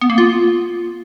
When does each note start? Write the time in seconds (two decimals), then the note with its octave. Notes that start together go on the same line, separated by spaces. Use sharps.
0.01 B3
0.10 A#3
0.18 F4